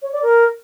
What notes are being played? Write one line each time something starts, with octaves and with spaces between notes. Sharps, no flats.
C#5
D5
A#4